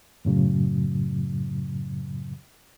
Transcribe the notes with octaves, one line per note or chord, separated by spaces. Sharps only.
F#2 A2 C#3 F#3